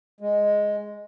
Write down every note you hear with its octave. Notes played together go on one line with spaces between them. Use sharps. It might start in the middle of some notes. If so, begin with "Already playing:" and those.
G#3